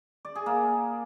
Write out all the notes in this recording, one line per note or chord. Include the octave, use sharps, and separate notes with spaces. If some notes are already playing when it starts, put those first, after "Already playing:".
D5
G#4
A#3